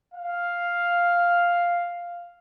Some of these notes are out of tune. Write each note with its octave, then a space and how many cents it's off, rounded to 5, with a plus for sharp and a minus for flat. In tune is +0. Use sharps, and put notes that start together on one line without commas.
F5 +0